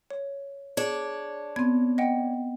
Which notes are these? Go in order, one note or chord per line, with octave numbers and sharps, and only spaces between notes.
C#5
D4 G#4 C#5
B3 C4 G#6
D#5 F#5 G5